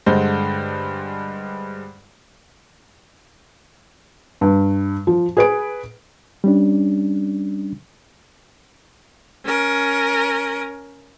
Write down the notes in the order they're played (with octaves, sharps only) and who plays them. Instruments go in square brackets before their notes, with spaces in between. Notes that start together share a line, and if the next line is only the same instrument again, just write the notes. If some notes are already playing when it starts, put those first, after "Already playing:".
[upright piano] G2 D3 G#3 C5
[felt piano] G2
F3
G#4 B4 D7
[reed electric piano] G3 C#4 D4
[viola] C#4 A#4